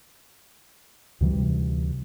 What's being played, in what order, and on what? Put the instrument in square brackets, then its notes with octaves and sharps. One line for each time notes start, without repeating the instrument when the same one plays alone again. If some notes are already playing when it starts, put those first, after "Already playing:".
[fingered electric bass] D2 C3 E3 G3